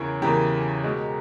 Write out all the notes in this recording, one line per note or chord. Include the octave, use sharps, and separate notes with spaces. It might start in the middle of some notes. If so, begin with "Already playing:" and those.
Already playing: E2 C#3 E3 A#4 C#5
E2 C#3 E3 G4 A#4
B2 G#3